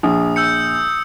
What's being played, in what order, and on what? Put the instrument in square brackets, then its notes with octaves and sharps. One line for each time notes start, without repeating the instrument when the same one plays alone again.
[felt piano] A#1 [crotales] D#6
[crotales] E6 G6 C#7